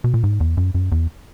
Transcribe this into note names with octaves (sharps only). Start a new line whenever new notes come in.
B2
A#2
G#2
E2
F#2
F#2
E2